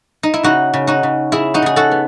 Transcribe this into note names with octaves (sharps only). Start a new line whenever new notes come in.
D#4
E4
C#3 D#4 F#4
C#3
D#4 F#4
C#3
C#3 E4 G#4
D#4 F#4
C#3 G#4
F#4 A4
B3